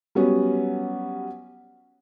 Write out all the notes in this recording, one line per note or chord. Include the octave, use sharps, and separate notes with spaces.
F#3 G3 B3 C#4